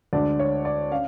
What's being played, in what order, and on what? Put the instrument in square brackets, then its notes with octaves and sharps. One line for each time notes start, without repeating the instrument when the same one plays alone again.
[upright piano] D2 D3 G#3 D4 D5
C#5
D5
C#4 F5